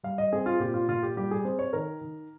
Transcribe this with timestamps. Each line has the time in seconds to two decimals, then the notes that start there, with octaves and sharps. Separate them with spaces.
0.03 G3 F5
0.18 D#5
0.32 C4 G#4
0.46 F4
0.60 A#2 G4
0.74 F4
0.88 A#2 F4
1.03 G4
1.17 G3 G4
1.31 G#4
1.45 C4 C5
1.59 C#5
1.73 D#3 A#4
2.01 D#3